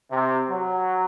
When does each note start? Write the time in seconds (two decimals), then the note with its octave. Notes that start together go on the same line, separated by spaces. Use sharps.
0.11 C3
0.49 F#3